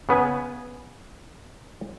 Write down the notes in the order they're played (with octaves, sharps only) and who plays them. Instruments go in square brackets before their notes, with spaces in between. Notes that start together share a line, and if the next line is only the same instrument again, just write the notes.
[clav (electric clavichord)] C#3 B3 B4 G#5